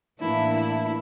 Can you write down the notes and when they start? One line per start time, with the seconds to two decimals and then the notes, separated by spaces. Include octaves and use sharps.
0.20 A2 E3 A#3 D4 E4
0.53 E4